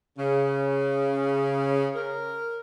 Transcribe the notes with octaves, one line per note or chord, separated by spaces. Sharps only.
C#3
A#4